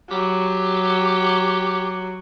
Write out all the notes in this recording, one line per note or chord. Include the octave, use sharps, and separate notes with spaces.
F#3 G4